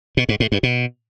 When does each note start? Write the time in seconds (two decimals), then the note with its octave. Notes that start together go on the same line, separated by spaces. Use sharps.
0.17 B2
0.29 G#2
0.40 A2
0.52 G2
0.63 B2